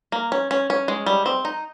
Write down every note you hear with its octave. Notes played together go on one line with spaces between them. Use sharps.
A#3
C#4
C#4
C#4
G#3
G3
C4
D#4